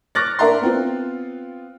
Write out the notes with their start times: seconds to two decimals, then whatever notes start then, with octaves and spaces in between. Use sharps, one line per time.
0.15 C#6 D6 F6 F#6 A6 A#6
0.39 D4 A#4 E5 A#5 C6
0.61 B3 C4 F4